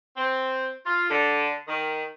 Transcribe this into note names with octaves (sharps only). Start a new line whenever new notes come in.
C4
F4
D3
D#3